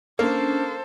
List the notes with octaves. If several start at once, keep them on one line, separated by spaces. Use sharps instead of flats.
A#3 C#4 D4 A4 C5